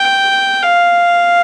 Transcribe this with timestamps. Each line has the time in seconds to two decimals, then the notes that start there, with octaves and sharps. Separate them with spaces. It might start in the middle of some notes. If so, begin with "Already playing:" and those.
Already playing: G5
0.63 F5